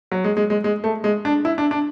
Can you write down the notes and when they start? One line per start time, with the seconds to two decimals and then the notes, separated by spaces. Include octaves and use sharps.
0.12 F#3
0.24 G#3
0.37 G#3
0.50 G#3
0.64 G#3
0.84 A3
1.04 G#3
1.25 D4
1.45 E4
1.58 D4
1.71 D4